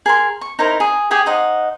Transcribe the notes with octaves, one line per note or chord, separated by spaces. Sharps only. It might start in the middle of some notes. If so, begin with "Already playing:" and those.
G#4 A#4 C6
C#6
D#4 E4 A#4 C5
G#4
G4 G#4 G5 D#6
D#4 C5 D#5 F#5